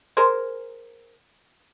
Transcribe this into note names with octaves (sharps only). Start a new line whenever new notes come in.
G#4 A#4 C5